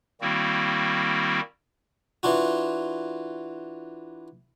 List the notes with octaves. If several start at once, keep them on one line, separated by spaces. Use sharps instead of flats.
D#3 G3 A#3 C4 E4 F#4
E3 D4 F4 F#4